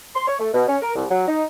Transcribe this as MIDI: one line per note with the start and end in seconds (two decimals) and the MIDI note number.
0.15 0.27 84
0.28 0.35 73
0.40 0.49 57
0.54 0.63 47
0.68 0.76 61
0.82 0.92 70
0.96 1.05 36
1.11 1.27 54
1.28 1.44 63